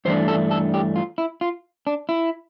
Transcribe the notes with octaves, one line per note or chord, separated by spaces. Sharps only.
G2 E3 A3 D4 C5
A4
A4
G4
F4
E4
F4
D4
E4